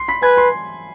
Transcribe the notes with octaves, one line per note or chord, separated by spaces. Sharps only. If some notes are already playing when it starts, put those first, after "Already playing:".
Already playing: C6 C7
B5 B6
B4 G#5 G#6
C6 C7